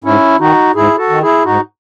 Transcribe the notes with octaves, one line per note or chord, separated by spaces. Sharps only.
G#2 C#4 E4
D#3 D#4 F#4
G#2 E4 G#4
F#4 A4
D#3
E4 G#4
G#2 D#4 F#4